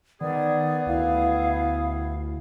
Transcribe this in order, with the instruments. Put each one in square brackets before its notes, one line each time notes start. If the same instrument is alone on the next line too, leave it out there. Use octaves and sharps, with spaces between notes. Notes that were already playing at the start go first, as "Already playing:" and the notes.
[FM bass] D#3 [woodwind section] B3 G#4 [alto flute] D5
[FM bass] D2 [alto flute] E4 [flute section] F5